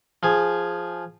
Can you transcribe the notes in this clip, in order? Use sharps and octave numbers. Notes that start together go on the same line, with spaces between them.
F3 G#4